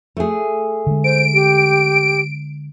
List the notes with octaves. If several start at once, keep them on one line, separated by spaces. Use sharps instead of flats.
A3 G#4
D3 G#3
C5 D7
G4